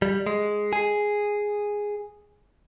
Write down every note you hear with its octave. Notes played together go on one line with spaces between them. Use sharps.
G3
G#3
G#4